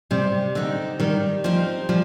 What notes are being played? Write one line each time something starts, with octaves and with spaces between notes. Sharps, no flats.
C3 G3
D3 C4 D#4 G4
D#3 G3
F3 C4 D#4 G4
F3 G3